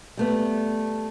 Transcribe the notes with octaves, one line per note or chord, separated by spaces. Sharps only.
G3 A3 B3